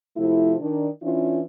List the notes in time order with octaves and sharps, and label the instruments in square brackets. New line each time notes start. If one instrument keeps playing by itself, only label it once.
[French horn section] C3 F3 A3 E4
D#3 D4
E3 C#4 D4 E4 F4